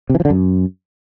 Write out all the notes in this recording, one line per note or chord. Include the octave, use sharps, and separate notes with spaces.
C3
E3
F3
D3
F#2